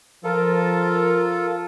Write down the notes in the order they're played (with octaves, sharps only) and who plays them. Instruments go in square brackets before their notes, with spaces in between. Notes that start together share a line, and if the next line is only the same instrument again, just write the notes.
[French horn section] F3 [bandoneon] F4 A4 [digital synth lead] A#4